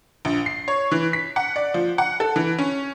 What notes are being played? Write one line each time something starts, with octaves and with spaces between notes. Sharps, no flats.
A#1
C7
C#5
E3
B6
F#5
D5
F3
F#5
A4
E3
C#4